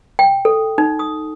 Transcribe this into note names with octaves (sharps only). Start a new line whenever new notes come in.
G5
A4
D#4
D#6